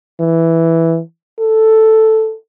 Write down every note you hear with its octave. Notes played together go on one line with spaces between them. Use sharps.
E3
A4